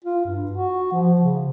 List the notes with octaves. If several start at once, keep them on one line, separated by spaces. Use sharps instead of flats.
F4
G2
F#4
F3
C#3